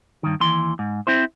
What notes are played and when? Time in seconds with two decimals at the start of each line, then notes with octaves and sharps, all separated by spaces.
0.23 G2 D#3
0.40 D#2 E3 C6
0.79 G#2
1.07 C4 E4 C5